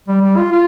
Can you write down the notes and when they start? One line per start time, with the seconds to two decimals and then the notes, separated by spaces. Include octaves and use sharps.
0.08 G3
0.22 G3
0.37 F4
0.52 F4